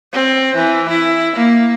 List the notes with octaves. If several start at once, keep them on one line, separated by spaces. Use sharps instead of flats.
C4
E3
E4
A#3